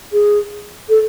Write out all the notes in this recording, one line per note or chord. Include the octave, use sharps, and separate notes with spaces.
G#4
A4